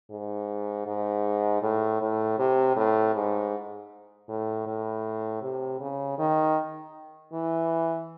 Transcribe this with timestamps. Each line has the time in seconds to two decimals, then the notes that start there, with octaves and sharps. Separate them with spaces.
0.10 G#2
0.86 G#2
1.62 A2
2.01 A2
2.38 C3
2.76 A2
3.15 G#2
4.29 A2
4.67 A2
5.42 C3
5.80 C#3
6.18 D#3
7.33 E3